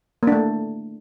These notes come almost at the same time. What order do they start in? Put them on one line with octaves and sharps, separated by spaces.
A#3 D4 A3